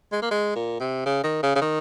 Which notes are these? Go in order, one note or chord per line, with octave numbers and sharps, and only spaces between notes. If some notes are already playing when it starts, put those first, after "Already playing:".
G#3
A#3
G#3
A#2
C3
C#3
D#3
C#3
C#3
D#3